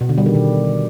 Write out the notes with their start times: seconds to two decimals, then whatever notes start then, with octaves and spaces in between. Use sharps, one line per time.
0.01 B2
0.09 D3
0.18 G3
0.26 D#3
0.35 B2